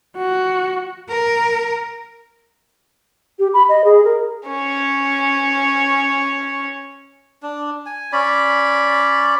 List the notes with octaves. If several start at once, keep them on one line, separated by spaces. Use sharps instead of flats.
F#4
A#4
G4
B5
D#5
G#4
A#4
C#4 C#5
D4
G#5
C#4 D5 B5